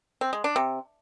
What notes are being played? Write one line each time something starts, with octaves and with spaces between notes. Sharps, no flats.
C4
G#3
D4
C3